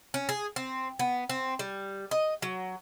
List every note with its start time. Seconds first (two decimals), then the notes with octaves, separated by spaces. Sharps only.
0.14 C#4
0.29 G#4
0.56 C4
0.99 B3
1.30 C4
1.59 G3
2.11 D#5
2.42 F#3